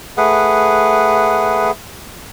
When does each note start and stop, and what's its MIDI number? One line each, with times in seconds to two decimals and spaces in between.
0.17 1.71 57
0.17 1.71 68
0.17 1.71 71
0.17 1.71 78